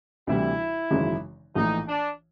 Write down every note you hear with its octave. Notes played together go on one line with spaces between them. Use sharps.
D2 C3 E3 G3 E4
G#1 F#2 C#3 E3 G#3
A#1 A2 E3 D#4
D4